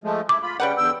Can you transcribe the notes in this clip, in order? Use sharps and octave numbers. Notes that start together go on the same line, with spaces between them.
F3 G#3 A3
E4 D6
F4 B5
C#3 G3 C#4 B4 F#5 G5
E2 D3 G5 E6